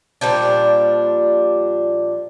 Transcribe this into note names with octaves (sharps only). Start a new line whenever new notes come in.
A#2 F3 G3 D4